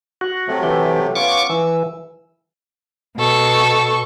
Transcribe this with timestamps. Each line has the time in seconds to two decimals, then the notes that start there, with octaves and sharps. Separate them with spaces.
0.21 F#4
0.48 C3 F#3 A3
0.63 E3 G4
1.15 B3 C#4 F4 C#6 D6
1.50 E3 E6
3.17 B2 A4 C#6